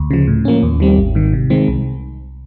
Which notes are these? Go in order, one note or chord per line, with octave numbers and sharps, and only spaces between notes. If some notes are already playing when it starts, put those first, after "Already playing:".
Already playing: D2
C#3 F3
A2
F3 A#3 C#4
D#2
D#3 G3 C4
G#1
G#2 D#3
C3
D#3 G#3 C4
C2